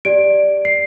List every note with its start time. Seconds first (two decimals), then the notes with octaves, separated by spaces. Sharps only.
0.05 G4 D5 D7
0.65 C7